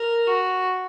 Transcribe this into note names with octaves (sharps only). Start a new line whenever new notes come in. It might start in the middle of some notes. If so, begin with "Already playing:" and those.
Already playing: A#4
F#4